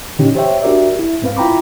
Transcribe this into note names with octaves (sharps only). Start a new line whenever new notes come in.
A#2 D3 E3 C#4 D#4 G4
G4 C5 C#5 E5 G5
D4 F#4 G4 A#4 D5 E5
E4
G#2 C4 B4 F5
E4 F4 G5 A#5 B5 D6